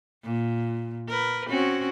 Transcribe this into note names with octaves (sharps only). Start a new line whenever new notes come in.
A#2
A#4 B4
C4 C#4 F#4